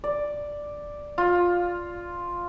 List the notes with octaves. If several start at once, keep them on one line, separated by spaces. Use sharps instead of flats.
D5
F4